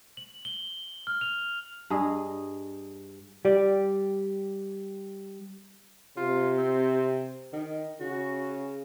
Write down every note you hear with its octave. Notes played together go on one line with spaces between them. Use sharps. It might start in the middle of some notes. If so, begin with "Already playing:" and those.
F#7
G7
F6
F7
G2 G#4 D#5
G3 G4 D5
C3 F4
C4
D#3
C#3 F#4